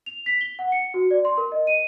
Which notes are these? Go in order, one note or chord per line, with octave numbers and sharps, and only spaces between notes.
F7
B6
G7
F#5
C#7
F#4
D5
C6
A#4
D#5
D#7